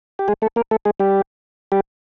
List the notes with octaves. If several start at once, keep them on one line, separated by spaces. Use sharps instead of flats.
G4
G#3 G#4
A3 A4
A#3 A#4
A3 A4
G#3 G#4
G3 G4
G3 G4